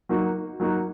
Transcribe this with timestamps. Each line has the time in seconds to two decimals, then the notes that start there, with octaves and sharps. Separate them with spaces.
0.09 F#3 A#3 D#4 F#4
0.60 F#3 A#3 D#4 F#4